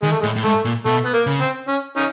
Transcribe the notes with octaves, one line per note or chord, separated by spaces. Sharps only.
D#3 G#3
A3
G#3
A2
A2
G#2 A3
A#2
B2 A3
B3
A#3
C#3
C4
C#4
C#4 D#4